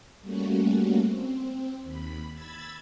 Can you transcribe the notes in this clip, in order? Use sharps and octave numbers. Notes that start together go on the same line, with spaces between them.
G3 A3 A#3 C#4 F#4
C4
D#2 B5
B5 E6 G#6 A6